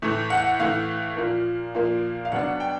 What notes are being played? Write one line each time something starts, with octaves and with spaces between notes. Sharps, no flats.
A2 E3 A3
F#5
A2 E3 A3 F5
A#2 F3 A#3
A#2 F3 A#3
F5
B2 F#3 B3 D4 F#5
G5